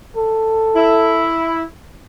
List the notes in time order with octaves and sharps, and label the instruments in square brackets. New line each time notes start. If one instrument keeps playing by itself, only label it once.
[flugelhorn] A4
[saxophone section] E4